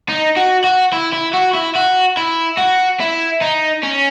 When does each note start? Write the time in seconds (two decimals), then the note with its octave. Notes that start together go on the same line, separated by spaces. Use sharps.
0.09 D#4
0.37 F#4
0.64 F#4
0.93 E4
1.13 E4
1.34 F#4
1.55 E4
1.76 F#4
2.17 E4
2.58 F#4
3.00 E4
3.42 D#4
3.83 C#4